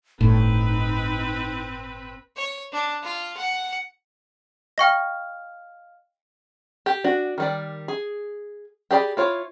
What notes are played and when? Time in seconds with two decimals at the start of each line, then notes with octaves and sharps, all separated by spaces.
0.21 G1 A2 C4 D#4 B4
2.36 C#5
2.73 D4
3.03 F4
3.37 F#5
4.78 D#5 F5 G5 C#6 F6 A#6
6.86 G4
7.04 D4 F#4
7.38 D#3 G3 D5
7.88 G#4
8.91 G4 G#4 D5 B5
9.17 E4 F4 C#5